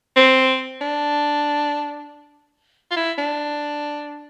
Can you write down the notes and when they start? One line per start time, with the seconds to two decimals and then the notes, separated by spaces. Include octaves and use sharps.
0.16 C4
0.81 D4
2.91 F4
2.96 E4
3.18 D4